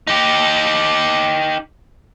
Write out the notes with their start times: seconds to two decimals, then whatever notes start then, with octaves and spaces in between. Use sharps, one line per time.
0.07 D#4 G4